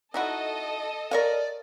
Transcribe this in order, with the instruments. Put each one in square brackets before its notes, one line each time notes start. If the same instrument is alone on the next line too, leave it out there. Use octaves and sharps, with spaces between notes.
[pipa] D#4 E4 F#4 [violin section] A4 D#5
[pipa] A#4 C#5 F5 [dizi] D5